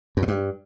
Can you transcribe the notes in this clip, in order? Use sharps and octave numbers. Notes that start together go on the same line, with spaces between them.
F#2
A2
G2